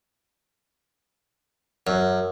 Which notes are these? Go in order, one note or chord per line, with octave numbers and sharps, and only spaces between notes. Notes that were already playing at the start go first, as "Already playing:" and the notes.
F#2